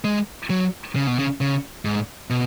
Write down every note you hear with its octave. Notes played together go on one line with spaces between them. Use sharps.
G#3
F#3
C#3
B2
C#3
C#3
G#2
B2